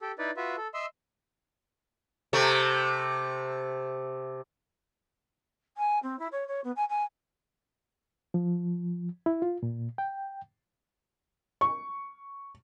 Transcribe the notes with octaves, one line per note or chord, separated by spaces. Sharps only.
G4 A4
D#4 E4 B4 D5
F4 F#4 B4 E5
A4
D#5 E5 C6 E6
C3 A3
G#5
C4
E4
C#5
C#5
B3
G#5
G#5
F3
E4
F4
A#2
G5
C#6